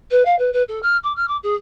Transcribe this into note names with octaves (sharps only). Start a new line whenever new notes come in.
B4
F5
B4
B4
A4
F6
D6
F6
D6
G#4